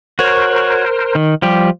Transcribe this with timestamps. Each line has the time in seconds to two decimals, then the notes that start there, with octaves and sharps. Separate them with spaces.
0.19 F#4 A#4 C5 C#5
1.15 D#3
1.42 F3 G3 G4